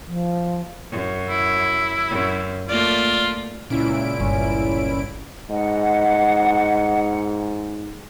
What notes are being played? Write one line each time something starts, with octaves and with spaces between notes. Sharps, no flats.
F3
F#2
E4
F#2
A3 A#3 F4 D5
C#2 A#2 C#4 E4 D7
G1 C#4
G#2 D#5 F#5